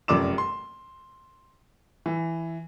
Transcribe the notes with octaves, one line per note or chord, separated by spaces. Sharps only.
F1 F#2 D5 D6 E7
C6
E3